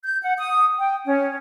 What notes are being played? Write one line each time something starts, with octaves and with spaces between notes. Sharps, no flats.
G6
F#5
D#6
G5
C#4